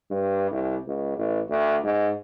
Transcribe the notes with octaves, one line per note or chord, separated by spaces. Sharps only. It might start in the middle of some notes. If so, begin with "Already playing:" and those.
G2
C2
C#2
A1
D2
G#2